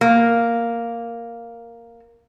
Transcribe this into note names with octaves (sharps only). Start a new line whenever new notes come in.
A#3